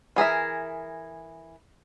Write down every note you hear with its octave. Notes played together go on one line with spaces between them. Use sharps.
E3 G#4 A#4 E5